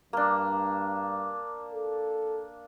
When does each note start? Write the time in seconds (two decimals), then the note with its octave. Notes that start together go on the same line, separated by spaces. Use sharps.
0.13 G2 A#3 D4
1.74 A4